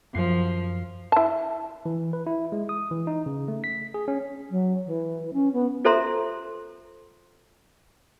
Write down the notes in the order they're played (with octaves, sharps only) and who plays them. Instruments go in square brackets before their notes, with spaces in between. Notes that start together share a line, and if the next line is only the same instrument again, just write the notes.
[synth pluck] F#2 C7 [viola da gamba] F3
[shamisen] E4 A5
[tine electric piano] E3
B4
E4
G#3
D#6
E3
D#4
C#3
A3
B6
G#4
C#4
[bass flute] F#3
E3
C#4
B3
[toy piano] F4 A4 C5 E5 A#5 C6